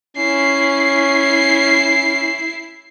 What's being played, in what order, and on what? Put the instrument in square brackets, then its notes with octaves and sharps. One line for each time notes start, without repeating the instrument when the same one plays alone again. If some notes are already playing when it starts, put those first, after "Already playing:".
[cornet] C#4 [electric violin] E4 C7